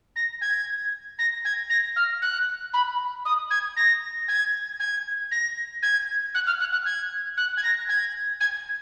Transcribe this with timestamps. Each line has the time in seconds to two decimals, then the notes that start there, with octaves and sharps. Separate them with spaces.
0.16 A#6
0.41 G#6
1.19 A#6
1.45 G#6
1.70 A#6
1.96 F6
2.22 F#6
2.73 B5
3.25 D#6
3.50 G#6
3.76 A#6
4.28 G#6
4.80 G#6
5.31 A#6
5.82 G#6
6.35 F#6
6.47 F6
6.60 F#6
6.72 F#6
6.85 G#6
7.37 F#6
7.57 G#6
7.63 A#6
7.89 G#6
8.40 G#6